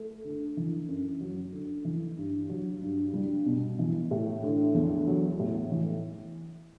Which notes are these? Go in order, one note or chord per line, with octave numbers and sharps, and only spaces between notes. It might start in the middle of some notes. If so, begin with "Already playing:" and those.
Already playing: A3
D3
E3
F#2
F#3
D3
E3
G2
F#3
G2
G3
B2
E3
A2
D3
E2
F#3
A2
E3